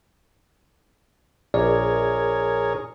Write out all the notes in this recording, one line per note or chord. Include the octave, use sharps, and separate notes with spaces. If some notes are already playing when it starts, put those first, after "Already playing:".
A#1 G#4 A#4 C#5 D5